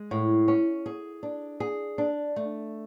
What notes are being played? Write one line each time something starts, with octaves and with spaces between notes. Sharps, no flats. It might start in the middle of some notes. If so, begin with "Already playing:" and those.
Already playing: G#3
A2
C#4
G#4
D4
G#4
D4
A3